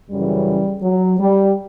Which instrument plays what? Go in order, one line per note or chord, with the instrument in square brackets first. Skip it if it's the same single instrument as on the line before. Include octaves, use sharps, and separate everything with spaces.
[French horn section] F#2 C#3 E3 G3
F#3
G3